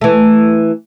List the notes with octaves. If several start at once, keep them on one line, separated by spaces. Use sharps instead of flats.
E3 A3